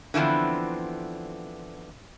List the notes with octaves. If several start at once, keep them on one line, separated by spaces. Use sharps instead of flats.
D3 E3 F3 B3 C4